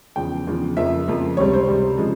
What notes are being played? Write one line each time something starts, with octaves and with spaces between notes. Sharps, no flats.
E2 C#3 F3 G5
E2 C#3 F3
F2 C#3 F3 A#3 E5
F2 C#3 F3 A#3
C#2 C3 G3 C#5
C5
C#2 C3 G3
C#3 F3 G#3